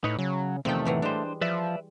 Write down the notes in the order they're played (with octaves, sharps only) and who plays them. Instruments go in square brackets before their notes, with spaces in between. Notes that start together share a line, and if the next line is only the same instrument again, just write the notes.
[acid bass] A2 [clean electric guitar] D#4 B4 C#5
[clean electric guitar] C#3 [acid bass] F#3
[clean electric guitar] E2 C3 D#3 [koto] F3 G5 [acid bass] A3
[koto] A2 E3 F#3
[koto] G3 G#3 [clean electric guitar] D4 C5
[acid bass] F3 [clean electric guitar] B4 D5 E5